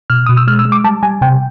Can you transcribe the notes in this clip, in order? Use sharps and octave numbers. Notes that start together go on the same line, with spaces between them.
B2 F6
B2 D#6
E6
G#3 F6
E6
G#3
D6
G3 A5
G3 G#5
C3 G5